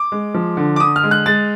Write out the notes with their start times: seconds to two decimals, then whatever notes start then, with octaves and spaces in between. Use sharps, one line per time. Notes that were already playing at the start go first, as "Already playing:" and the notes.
Already playing: D6
0.12 G#3
0.34 F3
0.57 D3
0.76 D6
0.80 D3 D#6
0.96 F6
1.04 G#3
1.11 F#6
1.26 G#3 A6